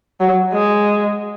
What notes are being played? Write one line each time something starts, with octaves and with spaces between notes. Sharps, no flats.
F#3
G#3